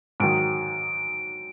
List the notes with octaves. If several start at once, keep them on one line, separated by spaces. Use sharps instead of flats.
G#2 D#3 F#3 D7